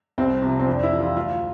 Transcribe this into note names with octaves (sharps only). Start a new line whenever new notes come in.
C2 C4
C3 F3
C4
F2 D4
E4
E3 G3
F4
D2 F4